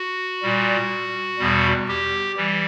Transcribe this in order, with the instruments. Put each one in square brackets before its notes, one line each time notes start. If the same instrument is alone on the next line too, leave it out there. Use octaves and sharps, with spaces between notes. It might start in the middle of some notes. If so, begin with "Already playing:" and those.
Already playing: [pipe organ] F#4
A#2 G3
E2 B2 G3
G4
E3 G3